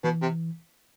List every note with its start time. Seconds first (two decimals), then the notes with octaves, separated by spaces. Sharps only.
0.04 B2 E3
0.22 C3